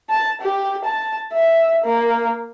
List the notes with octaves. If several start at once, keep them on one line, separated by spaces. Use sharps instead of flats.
A5
G4
A5
E5
A#3